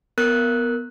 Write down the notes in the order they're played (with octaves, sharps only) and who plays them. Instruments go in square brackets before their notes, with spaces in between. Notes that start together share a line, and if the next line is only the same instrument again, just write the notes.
[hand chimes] B3 A#4 F#6